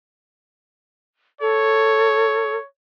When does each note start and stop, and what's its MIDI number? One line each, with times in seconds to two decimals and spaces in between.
1.41 2.56 69
1.41 2.66 73